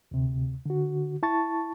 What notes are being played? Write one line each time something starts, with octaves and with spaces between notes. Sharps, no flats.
D2 C3
D3 F#4
E4 A5 C#6 A6